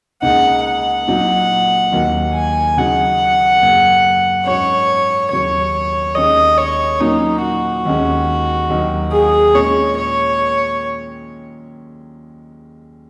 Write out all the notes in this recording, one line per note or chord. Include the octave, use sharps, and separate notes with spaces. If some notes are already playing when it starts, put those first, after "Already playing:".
C#2 C#3 A#3 D#4 F#5
F#5
A#2 F#3 D#4
D#2 D#3 F#3 A#3
G#5
C#3 F#3 D#4 F#5
F#2 C#3 A#3
G#2 F#3 C#4 C#5
D#2 C#3 F#3 C#5
D#2 D#3 G#3 C#4 D#5
C#5
A#2 F#3 A#3 C#4 D#4
F#4
D#2 D#3 G#3 C#4
D#2 D#3 F#3 A#3
G#4
A#2 G#3 C#4 C#5
C#5